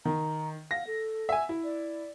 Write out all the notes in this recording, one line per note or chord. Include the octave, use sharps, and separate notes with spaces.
D#3 A#5
F5 A#6
A4
E5 G#5
E4
D5